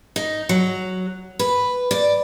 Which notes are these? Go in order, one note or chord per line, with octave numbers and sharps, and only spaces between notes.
D#4
F#3
B4
D5